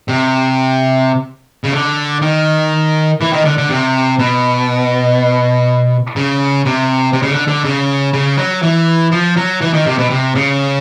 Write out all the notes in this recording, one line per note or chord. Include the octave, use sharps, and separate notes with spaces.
C3
C#3
D3
D#3
E3
D#3
D3
D3
C3
B2
C#3
C3
C3
C#3
D3
D3
C#3
C#3
F#3
E3
F3
F#3
E3
D#3
C3
B2
C3
C#3